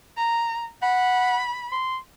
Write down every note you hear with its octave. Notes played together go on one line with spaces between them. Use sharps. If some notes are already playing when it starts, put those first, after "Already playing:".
A#5
F#5 B5
C6